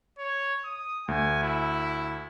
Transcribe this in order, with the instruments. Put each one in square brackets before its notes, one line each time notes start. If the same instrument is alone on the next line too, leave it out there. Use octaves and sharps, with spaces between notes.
[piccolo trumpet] C#5
D#6
[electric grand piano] D2 [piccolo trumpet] G#5
[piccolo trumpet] E4